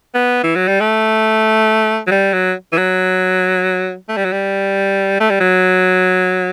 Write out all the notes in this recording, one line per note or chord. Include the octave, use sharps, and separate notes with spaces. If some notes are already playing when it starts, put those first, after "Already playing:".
B3
E3
F#3
G3
A3
F#3
G3
F#3
E3
F#3
A3
G3
F#3
G3
A3
G3
F#3